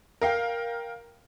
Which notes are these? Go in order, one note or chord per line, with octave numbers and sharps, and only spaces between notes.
A#4 F5 G5